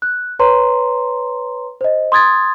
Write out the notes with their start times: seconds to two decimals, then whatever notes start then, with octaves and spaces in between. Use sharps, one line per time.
0.02 F#6
0.39 B4 C#5 A#5 C6
1.81 C5 D#5
2.12 C6 D#6 G#6 A6